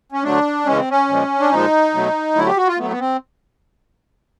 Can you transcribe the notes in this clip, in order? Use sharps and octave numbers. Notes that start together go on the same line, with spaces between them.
C#4
D3 F#3 A3 D4
C#3 E3 G#3 C#4
C4
C#4
A#2 F3 G#3
D4
A#2 F3 G#3 D#4
B2 F#3 A3
D3 F#3 A3 E4
G4
F#4
F4
A2 F#3 A3 B3
B3
C4